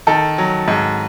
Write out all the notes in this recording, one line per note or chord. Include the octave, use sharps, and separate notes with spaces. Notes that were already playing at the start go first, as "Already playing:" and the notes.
D#3 A4
F#3
G#2